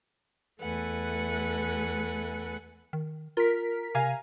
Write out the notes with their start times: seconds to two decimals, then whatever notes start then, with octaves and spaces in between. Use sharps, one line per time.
0.60 E2 A3 A4 B4 F#5 G#5
2.93 D#3
3.37 F4 A#4 B6
3.95 C3 F5 G#5 A#5